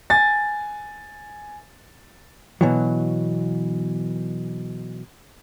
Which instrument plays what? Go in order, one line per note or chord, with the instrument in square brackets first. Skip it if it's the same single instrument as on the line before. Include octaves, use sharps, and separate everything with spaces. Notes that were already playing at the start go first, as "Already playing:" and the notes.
[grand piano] G#5 A6
[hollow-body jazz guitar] B2 E3 F#3